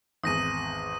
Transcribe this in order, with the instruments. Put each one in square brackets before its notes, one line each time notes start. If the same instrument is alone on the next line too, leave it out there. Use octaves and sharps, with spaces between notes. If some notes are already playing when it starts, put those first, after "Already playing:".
[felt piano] G#1 E2 [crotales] D#6 A#6 D#7